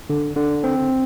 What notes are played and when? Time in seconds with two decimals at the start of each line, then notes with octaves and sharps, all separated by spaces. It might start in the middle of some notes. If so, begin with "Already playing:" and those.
0.10 D3
0.36 D3
0.64 C4